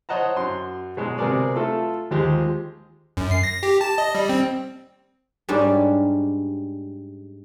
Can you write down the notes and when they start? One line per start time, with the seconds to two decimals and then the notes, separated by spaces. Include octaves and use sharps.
0.09 C5 C#5 D#5 F#5 A5 A#5
0.36 F#2 C6
0.97 B2 F#3 G#3
1.19 C3 B3 G#4 A#4 D5
1.56 A3 F4 A4
2.11 D#2 F3 G#3 G4
3.17 F#2
3.31 C7
3.43 A#6
3.63 G4
3.81 A5
3.98 D#5
4.15 G3
4.29 C4
5.49 G#2 G3 C#4 D4